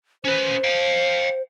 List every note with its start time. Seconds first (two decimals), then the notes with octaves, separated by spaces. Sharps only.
0.24 C#4 B4 C5
0.64 F5 G5